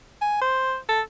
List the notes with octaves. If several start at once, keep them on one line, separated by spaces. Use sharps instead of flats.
G#5
C5
A4